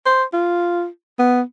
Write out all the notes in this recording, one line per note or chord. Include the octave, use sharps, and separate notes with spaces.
C5
F4
B3